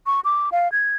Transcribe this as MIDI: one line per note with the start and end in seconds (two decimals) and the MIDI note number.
0.06 0.20 85
0.24 0.49 86
0.52 0.71 77
0.72 0.97 92